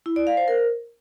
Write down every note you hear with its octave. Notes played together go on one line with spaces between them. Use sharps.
E4
D5
F5
C5
A#4